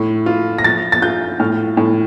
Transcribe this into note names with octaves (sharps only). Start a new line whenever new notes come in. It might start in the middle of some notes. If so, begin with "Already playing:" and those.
Already playing: A2 E4
F4
A#6
F3 A6
A6
F4 G6
A2 F6
A2